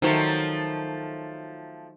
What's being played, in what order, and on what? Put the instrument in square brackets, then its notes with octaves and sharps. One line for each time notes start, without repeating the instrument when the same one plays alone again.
[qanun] D#3 F#3 C#5 [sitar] F3 A3 [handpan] D#4 C5